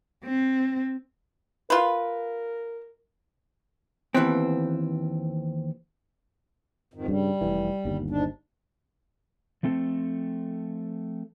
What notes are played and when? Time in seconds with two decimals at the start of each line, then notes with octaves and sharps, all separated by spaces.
0.24 C4
1.70 F4 A#4 B4
4.15 D#2 E3 B3 C4
6.94 F2 G#2 D#3
7.08 G2 C#3 G3
7.41 F1 B1 E3
7.85 G1 D#2
8.10 G#2 D4
9.63 F3 A3 C4 A4